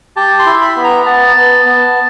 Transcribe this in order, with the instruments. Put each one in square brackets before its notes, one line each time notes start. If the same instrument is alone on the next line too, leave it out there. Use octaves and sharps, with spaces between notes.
[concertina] G4 A5
C6
E4
B5
B3
A#5
B3 A5
B3
B3